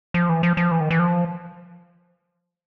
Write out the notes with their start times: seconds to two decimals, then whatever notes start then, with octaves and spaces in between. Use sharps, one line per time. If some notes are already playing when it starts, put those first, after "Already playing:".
0.14 F3
0.29 E3
0.43 F3
0.57 F3
0.71 E3
0.81 D#3
0.90 E3
0.99 F3